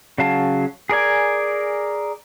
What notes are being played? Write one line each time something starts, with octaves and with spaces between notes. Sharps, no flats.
C#3 F#3 F5 A5
G#4 A#4 D5 G#5